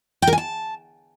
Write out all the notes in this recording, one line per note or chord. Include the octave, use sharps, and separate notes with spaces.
G5
A#4
G#5
A5